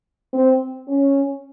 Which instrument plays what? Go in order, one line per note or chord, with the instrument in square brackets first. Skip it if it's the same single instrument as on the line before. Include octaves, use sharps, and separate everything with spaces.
[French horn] C4
C#4